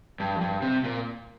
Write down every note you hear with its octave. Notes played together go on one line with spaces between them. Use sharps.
G2
F2
G2
C3
A#2